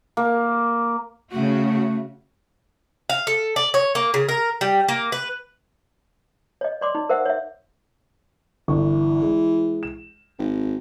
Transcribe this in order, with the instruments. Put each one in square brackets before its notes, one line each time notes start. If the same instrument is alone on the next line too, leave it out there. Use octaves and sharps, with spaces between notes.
[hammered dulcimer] A#3
[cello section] C#3 F#4 [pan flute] A3
[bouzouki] F5
A4
D5
C#5
A#3
C#3
A#4
G3
A#3
B4
[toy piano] C#5 D#5
D5 C6 D6
D#4
A#4 C5 E5 F#5
C#5 E5
[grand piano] G1 C#6 [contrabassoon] E3
[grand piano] G#3
E7
[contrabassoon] G#1